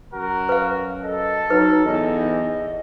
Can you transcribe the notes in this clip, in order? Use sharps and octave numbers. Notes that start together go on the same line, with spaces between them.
F#2 F#4 A#4
B4 F5
A4 D#5
F#3 D#4 B4
E2 D#5